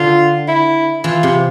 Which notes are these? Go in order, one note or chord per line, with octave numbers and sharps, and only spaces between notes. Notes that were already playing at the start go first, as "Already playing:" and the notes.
Already playing: D3 F4
E4
E3 F4
C3